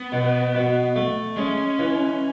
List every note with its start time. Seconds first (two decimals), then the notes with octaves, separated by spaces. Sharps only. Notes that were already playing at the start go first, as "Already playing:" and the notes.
Already playing: B3
0.12 B2
0.54 B2
0.96 A3
1.37 G#3 C#4
1.79 E3